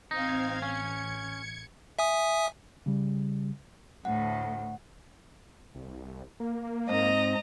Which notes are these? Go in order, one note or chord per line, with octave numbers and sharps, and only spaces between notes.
A1 C4 D#4 F5 G#6
C#4 G#6 C#7
E5 G#5 D#6
C#3 G3
D2 A2 F#5
C2
A#3
G#2 C4 D#5 A#5